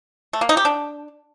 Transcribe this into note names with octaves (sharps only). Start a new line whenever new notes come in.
A3
A#3
D#4
G4
D4